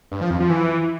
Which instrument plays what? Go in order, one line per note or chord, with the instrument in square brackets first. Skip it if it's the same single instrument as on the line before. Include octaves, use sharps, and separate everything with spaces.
[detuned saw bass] G2
F3
F2
F3
E3